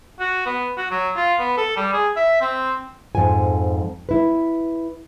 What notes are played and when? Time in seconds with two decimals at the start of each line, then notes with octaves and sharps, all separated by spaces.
0.20 F#4
0.46 B3
0.77 F#4
0.91 F#3
1.17 F4
1.39 B3
1.58 A4
1.77 G3
1.93 G#4
2.17 E5
2.41 C4
3.15 F2 G#2 F4 G#5
4.09 E4 B4